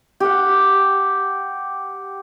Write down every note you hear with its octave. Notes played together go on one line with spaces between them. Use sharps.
G4 F#5